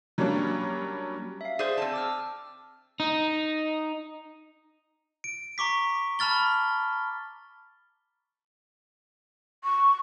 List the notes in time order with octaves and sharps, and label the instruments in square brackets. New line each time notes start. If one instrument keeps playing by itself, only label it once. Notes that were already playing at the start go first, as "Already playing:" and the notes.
[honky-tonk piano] F#3 G3 A#3 C#4 D4
[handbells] E5 F5
[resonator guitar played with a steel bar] G#4 C5 [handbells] D5
[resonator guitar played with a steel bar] C4 A5
[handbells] D6 E6 F6
[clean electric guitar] D#4
[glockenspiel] D7
A#5 C#6 D6 B6
A5 B5 F6 A6 G7
[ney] C#6